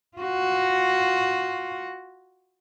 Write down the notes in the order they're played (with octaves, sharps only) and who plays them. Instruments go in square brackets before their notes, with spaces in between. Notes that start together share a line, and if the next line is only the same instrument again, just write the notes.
[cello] F4 F#4